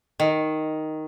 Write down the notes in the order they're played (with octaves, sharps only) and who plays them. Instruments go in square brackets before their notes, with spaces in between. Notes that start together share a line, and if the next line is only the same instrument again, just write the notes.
[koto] D#3